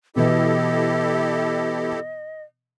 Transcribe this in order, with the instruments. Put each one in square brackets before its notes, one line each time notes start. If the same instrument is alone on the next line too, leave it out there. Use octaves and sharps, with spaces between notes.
[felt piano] B2 E3 [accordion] E4 G4 A4 [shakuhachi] D#5